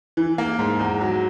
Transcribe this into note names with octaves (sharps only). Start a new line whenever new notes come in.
E3
A#3
G#2
E2
F#3